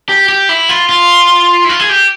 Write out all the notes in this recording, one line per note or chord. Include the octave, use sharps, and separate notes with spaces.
G4
G4
E4
F4
F4
E4
F4
G#4
G4